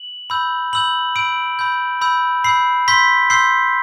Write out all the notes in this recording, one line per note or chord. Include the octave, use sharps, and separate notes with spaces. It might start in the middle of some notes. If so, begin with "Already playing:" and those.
Already playing: F#7
B5 E6 G6
B5 E6 G6 F#7
B5 E6 G6 D7
B5 E6 G6
B5 E6 G6
B5 E6 G6 C7
C6 E6 G6 B6
C6 E6 G6 C7